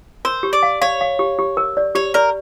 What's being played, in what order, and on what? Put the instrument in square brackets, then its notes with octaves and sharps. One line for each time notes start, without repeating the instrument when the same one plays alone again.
[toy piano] A#4 [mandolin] C5
[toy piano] G4
[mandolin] D5
[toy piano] F5
[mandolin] C#5 [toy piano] F5
[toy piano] F5
G4
G4
A#4
D5
[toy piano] G4 [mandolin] C#5
[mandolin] A#4 [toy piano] D5